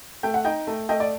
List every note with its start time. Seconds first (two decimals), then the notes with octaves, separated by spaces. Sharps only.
0.23 A3 G5
0.34 F#5
0.45 D#4 D#5 G5
0.67 A3
0.89 A3 D#5 G5
1.00 D5